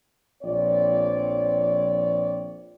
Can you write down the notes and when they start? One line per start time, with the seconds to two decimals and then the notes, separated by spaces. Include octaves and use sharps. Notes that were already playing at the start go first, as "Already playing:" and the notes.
0.43 A#1 F3 C4 C#5 D5